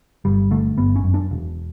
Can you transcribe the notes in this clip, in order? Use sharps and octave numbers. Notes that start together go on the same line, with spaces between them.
G1 G3
D3 A3
G1 B3
C#4
F#2
D4
E1